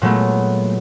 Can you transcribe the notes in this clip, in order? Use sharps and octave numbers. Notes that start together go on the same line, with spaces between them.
A#2 F#3 G#3 A3 B3